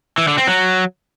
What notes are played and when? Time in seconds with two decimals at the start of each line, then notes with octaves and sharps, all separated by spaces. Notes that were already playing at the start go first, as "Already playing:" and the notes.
0.18 E3
0.28 D3
0.38 C4
0.47 F#3